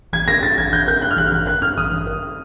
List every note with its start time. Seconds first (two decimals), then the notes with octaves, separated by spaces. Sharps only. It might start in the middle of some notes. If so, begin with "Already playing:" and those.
0.13 A1 G#6
0.28 D#3 A#6
0.43 G2 A6
0.58 A1 G#6
0.73 A1 G6
0.88 D#3 G6
1.02 G2 F#6
1.11 F6
1.17 A1 F#6
1.32 A1 F#6
1.47 D#3 F#6
1.62 G2 F6
1.78 A1 D#6
1.92 A1
2.07 D#3